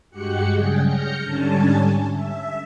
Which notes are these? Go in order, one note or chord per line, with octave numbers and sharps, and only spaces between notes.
G2 G#3 F#4 G4 F#6 C#7
C#3 F#3 G3 G#4 G5
F6 G6 A#6 C#7
G#2 D3 G3 C#4 G#5 A5
E5